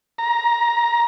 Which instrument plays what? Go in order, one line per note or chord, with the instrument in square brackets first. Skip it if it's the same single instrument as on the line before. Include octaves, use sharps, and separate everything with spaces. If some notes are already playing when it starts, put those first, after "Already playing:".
[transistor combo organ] A#5